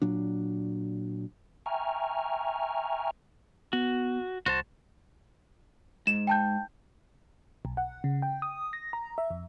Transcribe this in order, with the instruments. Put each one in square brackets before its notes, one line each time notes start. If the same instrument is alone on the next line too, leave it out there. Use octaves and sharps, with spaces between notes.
[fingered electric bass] A#2 F#3 D4
[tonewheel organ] E5 G5 G#5 A#5 C#6 F6
[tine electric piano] B3 [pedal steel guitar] F#4
[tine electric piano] C2 [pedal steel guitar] F#4 C5 A5
[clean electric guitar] G#2 [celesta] E7
[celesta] G5 A5 G6
[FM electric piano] B1
F#5
C#3
G5
D#6
A#6
A#5
E5
F2